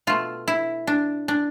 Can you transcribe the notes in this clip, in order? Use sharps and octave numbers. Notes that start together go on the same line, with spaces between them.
B2 A3 F4
E4
D4
D4